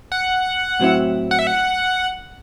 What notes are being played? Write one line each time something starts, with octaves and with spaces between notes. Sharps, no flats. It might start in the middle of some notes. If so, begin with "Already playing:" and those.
F#5
A2 F#3 C4 E4
F#5
E5
F#5